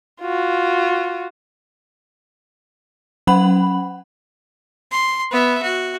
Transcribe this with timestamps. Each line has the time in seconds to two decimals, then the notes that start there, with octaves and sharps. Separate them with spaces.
0.22 F4 F#4
3.27 F#3 C#4 F#5 B5 F#7
4.91 C6
5.31 B3 E5
5.63 F#4